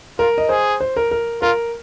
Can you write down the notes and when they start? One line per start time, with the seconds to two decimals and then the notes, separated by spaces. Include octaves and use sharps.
0.19 F4 A#4
0.38 D#5
0.49 G#4 C5
0.80 C5
0.96 A#4
1.11 A#4
1.42 F4 A#4